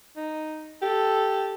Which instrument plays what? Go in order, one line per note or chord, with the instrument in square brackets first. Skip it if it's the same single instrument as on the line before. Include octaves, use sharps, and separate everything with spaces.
[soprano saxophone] D#4
[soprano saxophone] G4 [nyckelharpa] A4